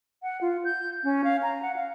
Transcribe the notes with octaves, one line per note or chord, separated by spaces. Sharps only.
F#5
F4
G6
C#4
F5
A#5
F#5
F5